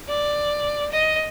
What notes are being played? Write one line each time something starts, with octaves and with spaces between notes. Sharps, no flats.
D5
D#5